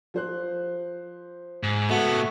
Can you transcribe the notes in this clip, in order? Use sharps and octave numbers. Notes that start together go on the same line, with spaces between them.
F3 C5 F#6
G#2
A2 B3 F#4 A4 E5